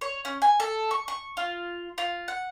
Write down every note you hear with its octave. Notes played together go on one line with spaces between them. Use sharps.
C#5
C#4
G#5
A4
C#6
C#6
F4
F4
F#5